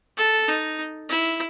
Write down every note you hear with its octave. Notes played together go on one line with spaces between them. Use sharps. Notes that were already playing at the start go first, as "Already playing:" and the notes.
A4
D#4
E4